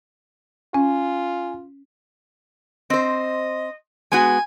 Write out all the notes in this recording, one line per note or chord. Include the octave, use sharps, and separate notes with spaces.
C#4 F4 G#5
C4 C5 D#5
G#3 B3 F#4 G#5